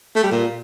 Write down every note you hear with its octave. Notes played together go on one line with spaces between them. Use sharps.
A3
G3
A#2